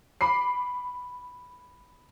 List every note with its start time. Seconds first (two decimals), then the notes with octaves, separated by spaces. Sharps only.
0.21 B5 D6 C7